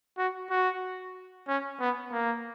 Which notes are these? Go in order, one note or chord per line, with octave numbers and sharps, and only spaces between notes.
F#4
F#4
C#4
B3
A#3